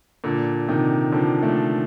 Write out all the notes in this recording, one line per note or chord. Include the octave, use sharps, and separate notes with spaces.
A#2 D3
C3 D#3
D3 F3
F3 A3